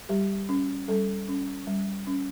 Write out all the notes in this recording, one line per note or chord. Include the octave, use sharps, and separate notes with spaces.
G3 G4
C#4
G3 A4
C#4
G3
C#4